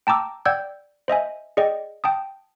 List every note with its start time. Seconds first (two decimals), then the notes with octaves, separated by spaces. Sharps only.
0.07 G5 A5 A#5 D6 E6
0.45 D5 F#5 G5 E6 G6 G#6
1.08 C5 D#5 E5 G#5
1.57 G#4 D5 D#5 G5
2.04 G5 A5 D#6